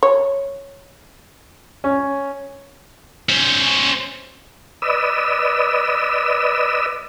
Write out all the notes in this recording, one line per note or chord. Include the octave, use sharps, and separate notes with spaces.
C#5
C#4
C#4 C5
B4 D5 D#5 E6